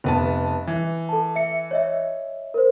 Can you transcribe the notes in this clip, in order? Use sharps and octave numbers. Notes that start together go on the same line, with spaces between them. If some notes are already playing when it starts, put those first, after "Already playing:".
F1 B3 A5
E3
A4 A5
E5 C#7
C#5 D#5 E5
A#4 C5